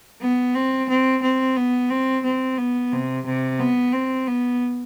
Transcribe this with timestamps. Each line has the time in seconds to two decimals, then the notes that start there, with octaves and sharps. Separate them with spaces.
0.21 B3
0.55 C4
0.89 C4
1.22 C4
1.56 B3
1.90 C4
2.24 C4
2.58 B3
2.92 C3
3.26 C3
3.60 B3
3.93 C4
4.28 B3